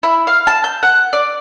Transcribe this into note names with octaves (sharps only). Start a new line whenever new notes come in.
E4
F5
A5
G6
F#5
D5